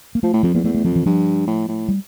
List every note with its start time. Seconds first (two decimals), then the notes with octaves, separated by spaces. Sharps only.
0.15 A#3
0.23 F3 A3
0.33 A2
0.43 F2 F3
0.54 E2 A#3
0.64 E2 A3
0.75 A3
0.84 F2 F3
0.96 E3
1.06 G2 F3
1.47 A2
1.68 A2
1.88 G3